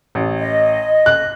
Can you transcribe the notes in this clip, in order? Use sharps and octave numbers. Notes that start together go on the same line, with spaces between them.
A1
D#5
F#6